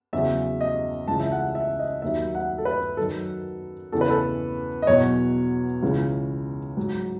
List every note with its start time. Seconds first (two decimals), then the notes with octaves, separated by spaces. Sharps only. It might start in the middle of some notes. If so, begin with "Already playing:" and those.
0.13 E2 C#3 F#3 E5
0.61 D#5
1.08 C#2 C#3 E3 A5
1.20 E5
1.32 F#5
1.55 E5
1.79 D#5
2.02 D#2 D#3 F#3 E5
2.35 F#5
2.58 A4
2.65 B4
2.97 F#2 D#3 F#3 A4
3.92 E2 C#3 E3 A4
4.01 B4
4.10 A4
4.82 D#5
4.87 E2 B2 F#3 C#5
5.83 C#2 C#3 E3
6.77 G#2 F#3